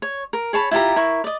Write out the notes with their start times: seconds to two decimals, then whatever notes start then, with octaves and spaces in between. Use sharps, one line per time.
0.02 C#5
0.33 A#4
0.53 G#4 C#5 A5 B5
0.71 E4 F4 G4 A#5
0.96 E4 A#4 C#6
1.24 D5 D#5